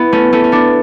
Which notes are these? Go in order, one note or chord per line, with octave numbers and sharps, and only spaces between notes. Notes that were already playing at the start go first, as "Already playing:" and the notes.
Already playing: B3 E4
A3 C#4
A3 C#4
C#4
B3 D4